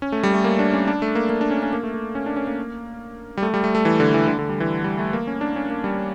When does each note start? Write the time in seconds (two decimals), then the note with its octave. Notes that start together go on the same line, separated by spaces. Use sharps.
0.02 C#4
0.12 A3
0.23 G3
0.34 A3
0.44 A#3
0.59 D4
0.74 C#4
0.87 D4
1.02 A3
1.15 A#3
1.30 A#3
1.41 D4
1.51 C#4
1.62 C#4
1.73 A#3
1.83 A3
1.94 A3
2.15 C#4
2.26 D4
2.36 C#4
2.47 A#3
3.37 G3
3.43 A3
3.54 G3
3.64 A3
3.75 A3
3.85 E3
4.00 D3
4.14 E3
4.27 D3
4.39 D3
4.49 G3
4.60 E3
4.84 G3
4.99 A3
5.13 A#3
5.27 C#4
5.41 D4
5.56 C#4
5.70 A#3
5.84 G3